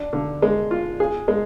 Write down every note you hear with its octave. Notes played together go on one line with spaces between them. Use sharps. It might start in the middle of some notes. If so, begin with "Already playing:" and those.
Already playing: D4
D3
G#3
F4
G#4
G#3